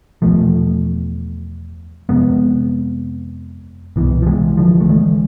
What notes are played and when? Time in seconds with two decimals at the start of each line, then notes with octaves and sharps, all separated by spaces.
0.22 E2 B2 F3 A3
2.09 F2 C3 G#3 B3
3.96 C2 B2 E3
4.22 F3
4.26 E3 G#3
4.58 D3 F3
4.80 A3
4.89 E3 G#3